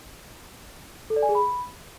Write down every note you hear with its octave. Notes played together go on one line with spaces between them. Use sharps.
A4
D5
G#5
G#4
B5